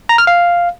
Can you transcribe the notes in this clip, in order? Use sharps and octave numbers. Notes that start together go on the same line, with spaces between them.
A#5
F6
F5